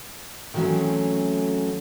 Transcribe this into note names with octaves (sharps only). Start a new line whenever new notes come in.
D#3 E3 F#3 A3 C4 C#4